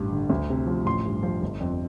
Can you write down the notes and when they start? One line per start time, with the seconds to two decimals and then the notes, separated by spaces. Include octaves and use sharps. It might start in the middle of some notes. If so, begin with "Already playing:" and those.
Already playing: A1 G2
0.12 D3
0.30 D2
0.49 C3
0.67 F3
0.86 A1 C6
1.05 G2
1.23 F3
1.42 G1
1.60 F2